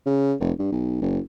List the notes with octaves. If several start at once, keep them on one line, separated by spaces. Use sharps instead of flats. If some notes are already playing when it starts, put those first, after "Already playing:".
C#3
F1
G2
B1
F#1